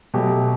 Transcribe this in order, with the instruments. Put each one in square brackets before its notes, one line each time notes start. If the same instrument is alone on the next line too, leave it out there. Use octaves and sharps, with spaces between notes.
[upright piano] B2 F#3 A3 G4